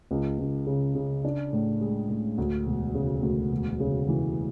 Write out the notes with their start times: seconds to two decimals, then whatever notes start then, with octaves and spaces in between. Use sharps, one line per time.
0.11 C#2
0.39 C#2
0.67 C#3
0.95 C#3
1.25 D4
1.53 A2
1.81 G#3
2.10 A2
2.38 D2
2.66 E1
2.94 C#3
3.22 D2
3.52 E1
3.80 C#3
4.09 E3